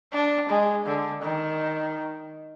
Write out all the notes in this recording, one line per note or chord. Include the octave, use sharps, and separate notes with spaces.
D4
G#3
D3
D#3